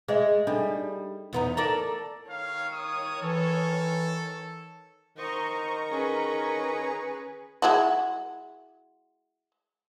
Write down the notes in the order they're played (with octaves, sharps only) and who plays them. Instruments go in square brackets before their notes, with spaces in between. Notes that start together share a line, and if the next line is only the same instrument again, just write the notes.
[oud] G#3 [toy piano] G#4 D#5 E5
[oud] G3 [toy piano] D4 D#4 A4
[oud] E2 B3 D#4
[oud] A4 A#4 D5 [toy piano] A#5
[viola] D#3 C#5 [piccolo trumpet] F5
[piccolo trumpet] D#6
[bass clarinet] E3 [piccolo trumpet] A4
[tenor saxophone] D#3 [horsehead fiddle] C5 D#5 [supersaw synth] A#5 C#6
[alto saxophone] C#4 [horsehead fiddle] G#4 B4
[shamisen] G#3 E4 F#4